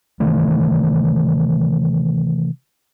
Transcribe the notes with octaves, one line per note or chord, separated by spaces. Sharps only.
C3 D#3 E3 A3